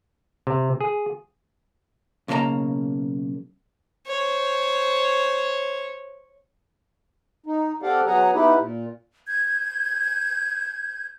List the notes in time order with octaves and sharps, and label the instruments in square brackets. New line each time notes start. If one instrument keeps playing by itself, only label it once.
[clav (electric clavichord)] C3
G#4
[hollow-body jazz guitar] B1 C#3 A#3 A4 A5 A#5
[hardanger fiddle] C5 C#5
[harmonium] D#4
C4 G4 A4 D5 F5 F#5
F#3 B3 G#4 F#5 G#5 A#5
B3 D#4 E4 G4 B4
A#2
[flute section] G6 G#6